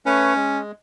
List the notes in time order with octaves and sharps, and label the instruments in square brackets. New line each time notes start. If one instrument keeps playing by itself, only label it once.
[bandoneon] A3 B4 C#5 [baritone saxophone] C#4
[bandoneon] G#3